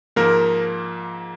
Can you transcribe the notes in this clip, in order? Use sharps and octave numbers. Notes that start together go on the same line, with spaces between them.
G#2 F3 A#3 A#4